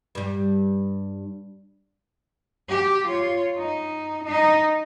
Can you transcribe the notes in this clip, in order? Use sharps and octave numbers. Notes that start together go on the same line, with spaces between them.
G2 G3
G4
F4 C#5
D#4
D#4